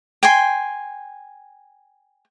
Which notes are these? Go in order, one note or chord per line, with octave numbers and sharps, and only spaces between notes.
G5 G#5 C6